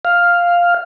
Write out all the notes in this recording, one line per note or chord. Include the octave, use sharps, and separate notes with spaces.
F5